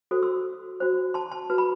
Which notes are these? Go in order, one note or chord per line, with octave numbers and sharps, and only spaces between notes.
F#4 A4 C5
C6 E6
F#4 C5
A5 C6
A5 C6
F#4 B4
B5